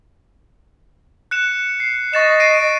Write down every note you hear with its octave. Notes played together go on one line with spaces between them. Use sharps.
F#6 C#7 E7
C7
D#5 C#6 A6 E7
C7 D7 D#7